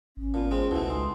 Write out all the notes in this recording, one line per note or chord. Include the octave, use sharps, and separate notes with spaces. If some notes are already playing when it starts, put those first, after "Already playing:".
G#1 C#4
A#2 B3 F4 A5
G#3 C4
C#2 B2 A3 E4
G#3 D#4 C6 D#6